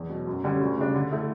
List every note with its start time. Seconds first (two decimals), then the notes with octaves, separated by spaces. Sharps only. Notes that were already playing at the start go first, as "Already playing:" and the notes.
Already playing: E2
0.09 B2 F#3
0.27 F#2
0.44 D3 G3 C#4
0.61 D2
0.78 C#3 G3 D4
0.94 D3
1.12 A3 E4